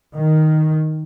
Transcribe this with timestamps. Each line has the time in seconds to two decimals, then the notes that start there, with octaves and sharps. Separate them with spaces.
0.15 D#3